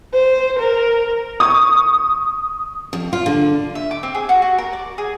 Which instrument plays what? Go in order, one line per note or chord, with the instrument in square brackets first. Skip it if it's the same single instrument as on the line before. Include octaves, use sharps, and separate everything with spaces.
[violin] C5
A#4
[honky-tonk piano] C#6 D#6
[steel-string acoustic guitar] F2
F4
D3
[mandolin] E5
D6
C4
G#4
F#4
F#4
A#4
D5
G#4